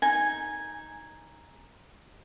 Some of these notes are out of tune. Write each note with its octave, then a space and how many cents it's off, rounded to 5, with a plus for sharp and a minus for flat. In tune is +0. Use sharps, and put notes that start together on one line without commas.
D#4 +0 G#5 -5